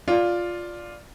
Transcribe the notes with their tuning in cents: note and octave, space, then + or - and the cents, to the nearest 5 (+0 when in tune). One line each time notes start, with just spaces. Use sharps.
F4 +5 D5 +0